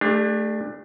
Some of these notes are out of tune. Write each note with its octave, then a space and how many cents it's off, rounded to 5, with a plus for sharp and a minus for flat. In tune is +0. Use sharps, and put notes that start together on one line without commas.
A3 +0 D4 +15 G4 +45